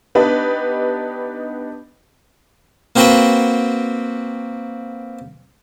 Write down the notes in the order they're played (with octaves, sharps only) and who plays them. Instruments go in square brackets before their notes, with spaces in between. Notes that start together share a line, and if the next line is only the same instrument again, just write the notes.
[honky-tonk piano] B3 D4 D#4 G4 B4
[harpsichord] A#3 C4 F#4 B4 F#5 G5